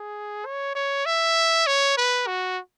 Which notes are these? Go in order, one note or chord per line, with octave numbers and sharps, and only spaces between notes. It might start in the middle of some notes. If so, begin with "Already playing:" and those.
Already playing: G#4
C#5
C#5
E5
C#5
B4
F#4